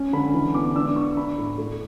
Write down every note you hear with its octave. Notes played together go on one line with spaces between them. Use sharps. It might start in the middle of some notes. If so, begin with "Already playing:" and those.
Already playing: C#4
D3 B5
E3
B3 D6
D4 E6
D4 C#6
D4 B5
A2
A3